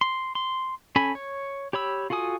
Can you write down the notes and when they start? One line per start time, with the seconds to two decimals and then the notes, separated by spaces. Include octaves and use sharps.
0.01 C6
0.35 C6
0.96 C#4 A4 G#5 B5
1.15 C#5
1.73 G4 C#5 B5 E6
2.10 F4 F#4 A4 G#5 D#6